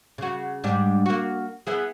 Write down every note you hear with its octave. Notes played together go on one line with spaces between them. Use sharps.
C#3 F#4
G#2 G3 D4
A#3 F#4
B3 E4 G#4